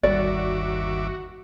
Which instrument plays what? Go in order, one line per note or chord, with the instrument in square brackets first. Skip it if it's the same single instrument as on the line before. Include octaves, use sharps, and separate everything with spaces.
[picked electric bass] G1 G3 [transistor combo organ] D#2 E5 D6 [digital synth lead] F#4 [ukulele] D5